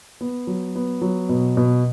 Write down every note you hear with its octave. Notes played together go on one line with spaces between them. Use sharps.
B3
F#3
B3
F#3
B2
B2